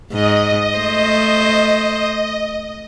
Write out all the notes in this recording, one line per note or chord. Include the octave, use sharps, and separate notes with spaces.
G#2 D#5
A3 C5